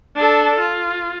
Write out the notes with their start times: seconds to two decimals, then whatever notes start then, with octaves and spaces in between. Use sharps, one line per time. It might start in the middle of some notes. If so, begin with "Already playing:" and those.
0.16 D4 A4
0.59 F4